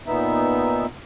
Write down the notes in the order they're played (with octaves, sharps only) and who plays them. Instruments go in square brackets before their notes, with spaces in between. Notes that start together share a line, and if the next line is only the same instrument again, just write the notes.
[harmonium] A#2 B3 D#4 E5